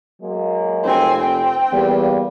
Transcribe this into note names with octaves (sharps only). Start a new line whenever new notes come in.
F#3 G#3 A#3
F1 C4 G#5
C4 G5
E2 G3 A#3